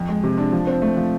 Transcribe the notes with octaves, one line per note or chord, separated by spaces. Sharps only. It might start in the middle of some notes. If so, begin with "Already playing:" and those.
Already playing: F2
G#3
C3
D4
F3
C4
A3
F3